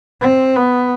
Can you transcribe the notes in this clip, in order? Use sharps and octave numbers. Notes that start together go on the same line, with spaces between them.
C4
B3